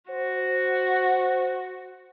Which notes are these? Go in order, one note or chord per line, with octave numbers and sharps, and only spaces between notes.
F#4 C5